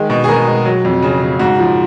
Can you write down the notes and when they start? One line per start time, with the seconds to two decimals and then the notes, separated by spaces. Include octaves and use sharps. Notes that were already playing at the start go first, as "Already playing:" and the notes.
Already playing: D#3 G#3
0.10 B2
0.24 G#4
0.28 B2 A#4
0.47 G#3
0.65 F#3
0.85 F2
1.02 C#3
1.22 C#3
1.39 G#2 F#4
1.59 F3